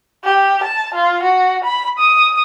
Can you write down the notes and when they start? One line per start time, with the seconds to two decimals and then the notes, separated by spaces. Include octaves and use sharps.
0.24 G4
0.64 A5
0.94 F4
1.23 F#4
1.64 B5
1.98 D#6